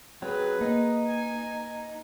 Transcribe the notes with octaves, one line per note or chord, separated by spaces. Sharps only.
F#3 C4 G#4 B4
A#3 D#4
G#5